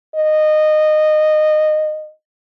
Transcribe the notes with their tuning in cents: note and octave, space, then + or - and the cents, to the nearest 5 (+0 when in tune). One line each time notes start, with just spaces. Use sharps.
D#5 -20